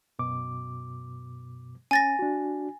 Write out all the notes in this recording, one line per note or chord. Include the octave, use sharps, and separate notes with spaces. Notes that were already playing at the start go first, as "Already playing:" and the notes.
F#2 B2 D6
C#4 G#5 A6 A#6
D4 F#4